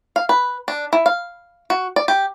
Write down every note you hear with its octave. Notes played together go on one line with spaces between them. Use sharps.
F5
B4
D4
E4
F5
F#4
D5
G4